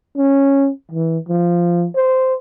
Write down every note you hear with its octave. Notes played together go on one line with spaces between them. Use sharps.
C#4
E3
F3
C5